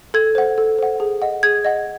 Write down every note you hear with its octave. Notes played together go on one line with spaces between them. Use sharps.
A4 G#6
C5 F#5
A4
C5 F#5
G#4
D#5 F#5
G#4 G#6
D#5 F#5